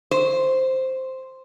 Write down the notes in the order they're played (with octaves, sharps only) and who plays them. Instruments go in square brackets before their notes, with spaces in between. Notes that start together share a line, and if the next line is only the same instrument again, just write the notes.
[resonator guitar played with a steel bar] C5